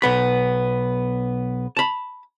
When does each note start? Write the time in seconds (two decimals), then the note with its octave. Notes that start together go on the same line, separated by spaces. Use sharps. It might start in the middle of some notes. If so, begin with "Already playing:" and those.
0.02 B1 B3 B5
1.77 A5 B5